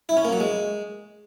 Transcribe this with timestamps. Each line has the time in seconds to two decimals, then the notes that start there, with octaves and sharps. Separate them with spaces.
0.09 E4
0.17 C#4
0.25 A#3
0.32 F#3
0.40 G#3